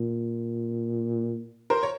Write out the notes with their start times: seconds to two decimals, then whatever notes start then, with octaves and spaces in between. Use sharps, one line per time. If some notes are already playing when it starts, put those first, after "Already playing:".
Already playing: A#2
1.70 A#4 C5
1.83 C#5